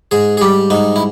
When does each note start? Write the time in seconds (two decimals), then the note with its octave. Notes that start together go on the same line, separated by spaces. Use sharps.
0.11 G#2 G#4
0.37 G#4
0.41 G3 G4
0.70 G#2 D#4
0.96 E4